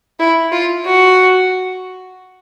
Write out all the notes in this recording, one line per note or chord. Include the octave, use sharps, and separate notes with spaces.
E4
F4
F#4